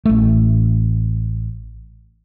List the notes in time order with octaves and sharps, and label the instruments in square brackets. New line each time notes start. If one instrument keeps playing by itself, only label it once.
[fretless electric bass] A1 A3